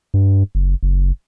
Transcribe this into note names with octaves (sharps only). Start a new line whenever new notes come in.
G2
F#1
F#1